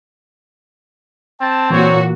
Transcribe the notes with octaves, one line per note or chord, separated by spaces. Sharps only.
C4 G5 A5
A#2 E3 F#3 F#4 C#5